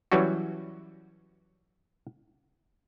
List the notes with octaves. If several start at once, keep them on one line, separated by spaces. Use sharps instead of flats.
E3 F#3 G3 C#4 F#4